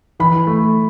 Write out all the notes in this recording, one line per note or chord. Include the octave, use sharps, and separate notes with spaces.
E3 B5
A3